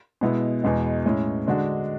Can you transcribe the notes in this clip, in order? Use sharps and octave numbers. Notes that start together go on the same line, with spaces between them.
B2 G#3 B3 E4
E2 B2 G#3 B3
A2 G#3 C#4 E4
D3 G#3 D4 F#4